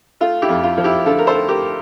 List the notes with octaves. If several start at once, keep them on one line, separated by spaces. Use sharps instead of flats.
A3 F4
E4 G4
F2
F4
F3
E4 G4
D3 F4 A4
A#4
A4 C5
A3
G4 A#4